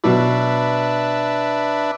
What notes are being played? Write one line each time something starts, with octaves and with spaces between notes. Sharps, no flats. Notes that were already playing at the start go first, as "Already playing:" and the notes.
B2 F#3 D4 B4 E5